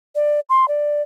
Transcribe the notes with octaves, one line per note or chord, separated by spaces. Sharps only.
D5
C6
D5